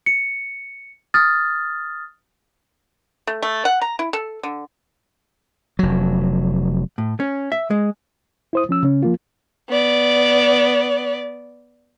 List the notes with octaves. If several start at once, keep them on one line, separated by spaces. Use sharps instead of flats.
C#7
D#6 F6 A6
A3
A3
F#5
A#5
E4
A4
D3
F1 F#3
A2
C#4
E5
G#3
E4 C5 D#6
F3 C#4 E6
C#3 C#4
F3 A#3 F4
B3 D5